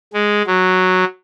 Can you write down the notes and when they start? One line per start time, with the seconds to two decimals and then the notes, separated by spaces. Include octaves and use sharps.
0.13 G#3
0.46 F#3